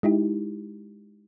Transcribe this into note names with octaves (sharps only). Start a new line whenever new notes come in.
G#3 D#4 E4 G4